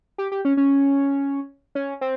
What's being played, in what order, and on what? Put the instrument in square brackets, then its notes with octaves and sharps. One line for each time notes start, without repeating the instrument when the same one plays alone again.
[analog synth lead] G4
G4
C#4
C#4
C#4
C4